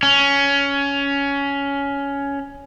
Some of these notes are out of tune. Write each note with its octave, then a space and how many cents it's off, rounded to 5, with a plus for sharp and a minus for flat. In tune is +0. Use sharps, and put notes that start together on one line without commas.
C#4 +15